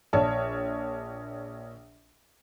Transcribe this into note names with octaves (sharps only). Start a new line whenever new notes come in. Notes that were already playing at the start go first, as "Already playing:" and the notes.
A#1 C#5 D5 A5